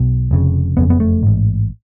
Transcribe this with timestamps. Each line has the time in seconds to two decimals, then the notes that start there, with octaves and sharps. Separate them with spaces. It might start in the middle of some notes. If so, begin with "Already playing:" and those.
Already playing: B1 B2
0.31 F1 F2 C#3
0.77 F#1 F2 C#3 B3
0.90 B3
1.00 A3
1.23 A1 G#2